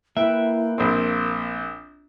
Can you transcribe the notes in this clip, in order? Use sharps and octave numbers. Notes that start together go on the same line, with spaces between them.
A#3 E4 B4 E5 G5
A#1 A#3 C4 D6